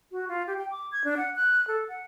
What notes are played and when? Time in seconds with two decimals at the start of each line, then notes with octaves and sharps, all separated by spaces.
0.12 F#4
0.29 F4
0.47 G4
0.58 G5
0.71 D6
0.92 G#6
1.04 D4
1.17 F#5
1.36 F#6
1.68 A4
1.89 F#5